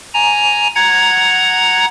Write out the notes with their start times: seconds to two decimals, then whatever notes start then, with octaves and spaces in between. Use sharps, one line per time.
0.14 G#5 A#5
0.75 F#5 A#5 G#6